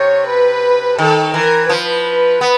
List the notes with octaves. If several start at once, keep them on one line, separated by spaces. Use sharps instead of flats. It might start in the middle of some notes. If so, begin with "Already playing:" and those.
Already playing: C3 C#5
B4
D#3 A4
E3 A#4
F3 B4
B3